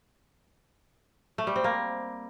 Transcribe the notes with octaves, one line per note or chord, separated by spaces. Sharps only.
A3
G3
C4
A#3